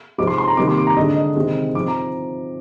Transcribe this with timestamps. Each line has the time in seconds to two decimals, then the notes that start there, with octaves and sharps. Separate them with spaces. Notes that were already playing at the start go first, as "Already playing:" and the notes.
0.18 C3 F3 G#3 C4 D#4 D6
0.27 C6
0.38 C6
0.48 A#5
0.57 C3 D#3 G3 A#3 D6
0.68 C6
0.77 D6
0.87 A#5
0.96 D3 G#3 D4 D#5
1.15 D#5
1.35 C3 D#3 G#3 C4 D#5
1.75 F3 C4 D#4 D6
1.88 A#5